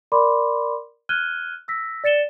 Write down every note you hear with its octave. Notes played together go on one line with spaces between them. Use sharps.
A#4 D5 B5 C6 D6
F6 F#6 G#6 D#7 G7
E6 A#6 B6
D5 A6 C#7 E7 G7